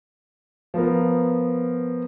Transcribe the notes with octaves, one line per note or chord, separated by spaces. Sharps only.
F3 B3 A#4